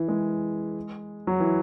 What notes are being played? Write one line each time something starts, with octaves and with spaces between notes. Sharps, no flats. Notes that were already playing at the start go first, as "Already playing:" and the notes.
Already playing: E3
G#3
F#3
E3